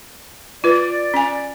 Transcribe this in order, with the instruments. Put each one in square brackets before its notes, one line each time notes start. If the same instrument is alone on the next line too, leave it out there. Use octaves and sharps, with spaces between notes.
[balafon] F4 B4 [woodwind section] D5
[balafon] C#4 G#5